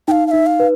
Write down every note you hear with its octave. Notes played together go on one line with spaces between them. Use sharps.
D#4 F5 G5
F5
D#4 E5
F5
B4